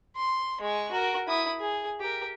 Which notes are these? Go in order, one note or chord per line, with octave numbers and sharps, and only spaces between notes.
C6
G#3 C#6
F#4 A#4
E4 D#6
G#4
G4 A#4